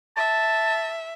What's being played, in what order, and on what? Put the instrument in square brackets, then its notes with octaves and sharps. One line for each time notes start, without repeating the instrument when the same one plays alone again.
[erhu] E5 [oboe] A5